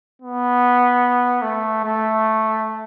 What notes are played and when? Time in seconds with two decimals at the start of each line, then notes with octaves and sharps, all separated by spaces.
0.22 B3
1.42 A3
1.84 A3